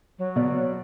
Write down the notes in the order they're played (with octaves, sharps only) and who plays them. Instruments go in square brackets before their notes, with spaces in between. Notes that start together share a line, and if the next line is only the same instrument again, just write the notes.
[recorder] F#3
[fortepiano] B2 D5